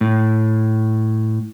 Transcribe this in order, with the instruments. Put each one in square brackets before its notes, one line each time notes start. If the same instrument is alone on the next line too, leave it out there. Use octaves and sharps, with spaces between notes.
[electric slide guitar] A2